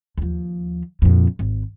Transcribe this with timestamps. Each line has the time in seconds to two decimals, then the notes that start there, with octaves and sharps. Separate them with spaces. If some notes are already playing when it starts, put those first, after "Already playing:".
0.18 D#2 F3
1.02 F2 A#2
1.39 G#1